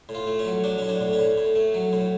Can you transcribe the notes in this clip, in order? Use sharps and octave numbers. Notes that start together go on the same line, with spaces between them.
A2
F4
A3
C#4
F#3
F#3 D4
A2 C#4
D4
A2
C#4
A2
A2
A3
F#3
A2